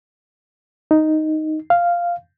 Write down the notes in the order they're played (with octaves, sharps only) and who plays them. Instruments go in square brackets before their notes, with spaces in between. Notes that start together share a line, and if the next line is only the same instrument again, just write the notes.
[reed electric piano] D#4
F5